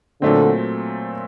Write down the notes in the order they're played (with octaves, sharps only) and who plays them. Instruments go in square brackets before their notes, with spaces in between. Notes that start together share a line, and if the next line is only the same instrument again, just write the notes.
[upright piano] A#2 F#3 A3 C4 [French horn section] D3